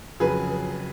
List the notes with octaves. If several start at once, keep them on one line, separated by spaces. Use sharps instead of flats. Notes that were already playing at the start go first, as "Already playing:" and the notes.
F2 C#3 F#3 G#4 B4